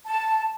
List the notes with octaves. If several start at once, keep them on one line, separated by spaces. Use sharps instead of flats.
A5